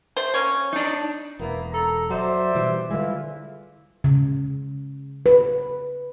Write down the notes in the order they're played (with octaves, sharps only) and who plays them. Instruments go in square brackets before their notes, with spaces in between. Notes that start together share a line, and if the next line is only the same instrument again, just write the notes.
[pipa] A3 C5
A#3 C#4 C#5
[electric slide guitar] D4 D#4
[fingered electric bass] E1 [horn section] A#3 B3 E4
[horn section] A4 A#5
[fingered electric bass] F#3 [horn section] C5 D5 E5
[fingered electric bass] B2 E3 G3
[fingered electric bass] D3 G3 G#3 [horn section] E3 E4 F4
[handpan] C#3
B4